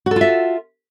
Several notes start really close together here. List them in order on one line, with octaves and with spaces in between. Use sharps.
F#4 A4 F4 E5